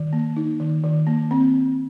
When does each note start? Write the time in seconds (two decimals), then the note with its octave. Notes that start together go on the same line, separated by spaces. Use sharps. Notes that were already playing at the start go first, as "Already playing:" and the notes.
Already playing: D#3
0.13 A#3
0.37 D#4
0.60 D#3
0.84 D#3
1.07 A#3
1.31 C4